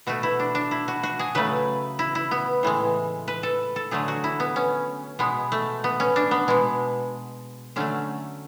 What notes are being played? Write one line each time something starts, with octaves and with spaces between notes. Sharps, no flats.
B2 A3 F#4
E4
D4
D4
E4
F#4
F#4
G#4
C#3 F#3 A3 B4
E4
E4
B3
A2 E3 G#3
B4
A4
A4
D3 F#3 A3 G#4
F#4
E4
B3
C#4
B2 G#3 B3
A3
B3
C#4
D4
B3
B2 G#3
D3 F#3 A3 C#4